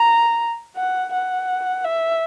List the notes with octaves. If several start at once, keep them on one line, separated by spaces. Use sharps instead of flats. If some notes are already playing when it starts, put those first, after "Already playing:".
Already playing: A#5
F#5
F#5
E5